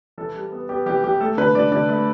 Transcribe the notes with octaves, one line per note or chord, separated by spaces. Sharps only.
E3 A4
G3
B3
B3 G4
E3 G4
E3 G4
A3 A4
D3 B4
D3 D5
D3 D5
A3